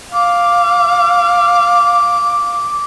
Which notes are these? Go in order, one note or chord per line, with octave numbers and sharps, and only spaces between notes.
F5 D6